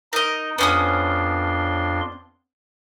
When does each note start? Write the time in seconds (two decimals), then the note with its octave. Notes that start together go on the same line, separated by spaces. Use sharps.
0.13 D#4 A#4 D#5
0.58 F2 B3 C#4 D4 C6 D#6